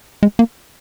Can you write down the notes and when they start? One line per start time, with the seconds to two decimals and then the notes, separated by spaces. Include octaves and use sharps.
0.23 G#3
0.39 A#3